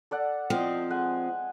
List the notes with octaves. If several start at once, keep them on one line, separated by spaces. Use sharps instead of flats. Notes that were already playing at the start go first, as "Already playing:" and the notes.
A4 D5 F#5
F3 C4 D#5 F5
G#3 F#5 G#5